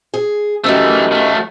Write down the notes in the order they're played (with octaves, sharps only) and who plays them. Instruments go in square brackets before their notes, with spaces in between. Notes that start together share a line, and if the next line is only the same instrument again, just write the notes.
[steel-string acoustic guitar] G#4
[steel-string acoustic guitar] F#2 D#3 G4 [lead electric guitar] E3 A3
[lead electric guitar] F#3 A3